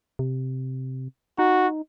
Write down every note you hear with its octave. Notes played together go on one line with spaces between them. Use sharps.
C3
D#4 F#4